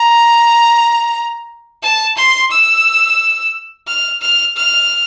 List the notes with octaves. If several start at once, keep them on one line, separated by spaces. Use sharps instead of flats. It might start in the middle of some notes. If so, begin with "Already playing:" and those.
Already playing: A#5
A5
C6
E6
F6
F6
F6